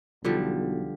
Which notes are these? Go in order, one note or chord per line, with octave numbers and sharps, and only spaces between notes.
B1 D3 F3 G3